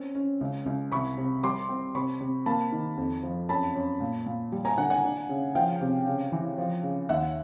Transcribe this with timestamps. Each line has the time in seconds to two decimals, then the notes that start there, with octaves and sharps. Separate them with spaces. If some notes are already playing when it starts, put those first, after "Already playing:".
Already playing: C4 C#4
0.15 C#4
0.41 C#2
0.66 C#2
0.91 C2 B5 C#6
1.17 C3
1.43 G3 C6 D6
1.69 C4
1.95 C3 B5 C#6
2.21 C3
2.46 A#3 A5 B5
2.72 D#3
2.97 F2
3.23 F3
3.49 F#2 A5 B5
3.75 F#2
4.00 A#2
4.26 A#2
4.52 G3
4.65 G#5 A#5
4.78 D3 F#5 G#5
4.90 F#5 G#5
5.04 D4
5.29 C#3
5.55 F3 F5 G5
5.81 C3
6.06 C#3
6.32 E3
6.58 F3
6.83 C#3
7.09 D#2 E5 F#5